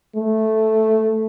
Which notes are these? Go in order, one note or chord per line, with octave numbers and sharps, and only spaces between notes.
A3